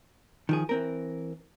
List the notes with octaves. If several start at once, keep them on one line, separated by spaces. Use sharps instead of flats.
D#3 F3 G#4
E3 C4 A#4